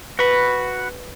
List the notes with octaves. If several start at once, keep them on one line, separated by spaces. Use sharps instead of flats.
F#4 B4 B5